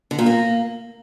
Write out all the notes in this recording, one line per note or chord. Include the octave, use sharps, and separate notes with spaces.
D3
A#2
A#3